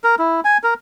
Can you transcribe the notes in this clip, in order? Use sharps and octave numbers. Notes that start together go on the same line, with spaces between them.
A#4
E4
G#5
A#4